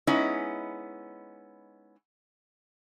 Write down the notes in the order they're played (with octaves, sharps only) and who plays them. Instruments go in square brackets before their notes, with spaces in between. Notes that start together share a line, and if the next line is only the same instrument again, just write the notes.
[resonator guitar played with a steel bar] G#3 B3 C#4 D#4 E4